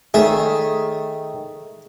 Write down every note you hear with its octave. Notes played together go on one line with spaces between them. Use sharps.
D#3 A3 G#4 C#5 E5